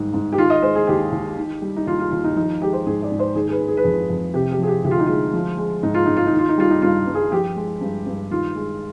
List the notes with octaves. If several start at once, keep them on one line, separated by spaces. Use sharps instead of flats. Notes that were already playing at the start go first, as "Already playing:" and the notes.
Already playing: G#2 D#3 G3
G#2
G4
D#3 F4
D#5
G#3 C5
G#4
D#2 G4
D#2
D#3
G3
D#4
D#2 F4
F4
D#2 F4
D#4
F3 D#4
G#3 G4
C5
G#2 G#4
D5
G#2
C5
D#3 G#4
G#4
B4
G#3
G#4
B4
F2 G#4
F2
C3 G4
G4
F3 G#4
G4
D2 G4
F4
D#4
G#3 F4
F3
G#3
G#2 D#4
F4
G#2 D#4
F4
D#4
D#3
F4
D#4
G3 F4
D#4
G2 F4
G2
G#4
F3 G4
G#3
G2
G2
D#3 F4
G#3